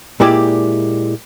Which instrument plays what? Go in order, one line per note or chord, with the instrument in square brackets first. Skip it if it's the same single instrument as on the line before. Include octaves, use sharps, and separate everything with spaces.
[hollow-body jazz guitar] A#2 G#3 E4 G4 D5